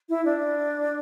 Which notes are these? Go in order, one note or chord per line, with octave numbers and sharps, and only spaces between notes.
E4
D4